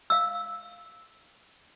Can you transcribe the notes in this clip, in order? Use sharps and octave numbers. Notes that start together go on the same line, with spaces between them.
F5 E6